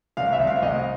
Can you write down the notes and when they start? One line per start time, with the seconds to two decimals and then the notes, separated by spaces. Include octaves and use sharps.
0.17 C2 F5
0.33 E5
0.40 C2
0.47 F5
0.62 C2 D#5